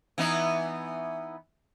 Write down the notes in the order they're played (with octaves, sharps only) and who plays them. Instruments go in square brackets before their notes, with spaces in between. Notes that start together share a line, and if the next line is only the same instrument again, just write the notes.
[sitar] E3 B3 D#4